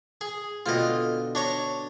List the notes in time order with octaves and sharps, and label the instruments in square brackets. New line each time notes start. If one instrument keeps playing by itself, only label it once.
[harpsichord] G#4
[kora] B2 D3 C4 [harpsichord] F4 D#5
[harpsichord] D4 C#5 A#5